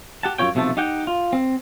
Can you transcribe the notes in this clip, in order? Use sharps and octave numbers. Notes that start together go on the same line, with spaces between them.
G4 F#5 A5
F#2 F#3 F4 C#5 G5
B1 C3 F3 A3 A5
D#4 G4 F#5 G5
F4
C4